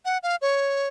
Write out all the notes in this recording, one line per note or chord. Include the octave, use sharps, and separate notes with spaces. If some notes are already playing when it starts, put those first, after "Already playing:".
F#5
F5
C#5